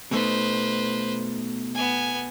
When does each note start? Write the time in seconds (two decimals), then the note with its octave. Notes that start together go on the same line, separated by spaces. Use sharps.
0.11 B2 A3 D#4 B4 C5
1.74 B3 G#5